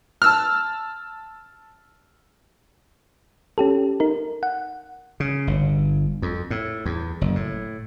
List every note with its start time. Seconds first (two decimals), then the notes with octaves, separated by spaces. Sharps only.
0.22 A5 E6 F6
3.58 C#4 G4 A4
4.00 D#4 A#4
4.43 F#5
5.20 C#3
5.47 G1
6.22 F2
6.50 A2
6.86 E2
7.21 F#1
7.35 A2